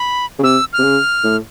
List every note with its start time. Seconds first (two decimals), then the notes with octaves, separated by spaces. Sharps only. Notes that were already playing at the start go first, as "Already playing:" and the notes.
Already playing: B5
0.39 C#3
0.43 C3 E6
0.73 F6
0.78 C3
0.83 C#3
1.24 A2